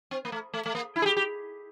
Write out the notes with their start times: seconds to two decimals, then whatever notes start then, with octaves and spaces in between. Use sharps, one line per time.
0.11 C4
0.25 A#3
0.32 A3
0.54 A3
0.66 A3
0.75 A#3
0.96 E4
1.02 G#4
1.06 G4
1.17 G4